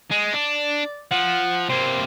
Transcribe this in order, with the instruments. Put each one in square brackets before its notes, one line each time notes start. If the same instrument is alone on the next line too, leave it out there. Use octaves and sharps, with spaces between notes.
[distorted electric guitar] G#3 [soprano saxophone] D#5
[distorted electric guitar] D4 [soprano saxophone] D5
[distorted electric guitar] F3 [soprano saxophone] F#5
[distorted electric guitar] C3 A#3 [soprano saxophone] C5